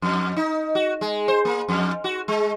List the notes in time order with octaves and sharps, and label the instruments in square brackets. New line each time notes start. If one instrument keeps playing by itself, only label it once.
[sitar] F2
D#4
F#4
G#3
C5
A#3
F2
F#4
G#3